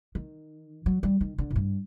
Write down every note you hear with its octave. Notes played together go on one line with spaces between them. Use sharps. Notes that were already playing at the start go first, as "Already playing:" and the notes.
D#3
F#3
G3
D#3
D3
A2
G2